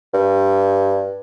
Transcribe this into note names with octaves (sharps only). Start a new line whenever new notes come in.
G2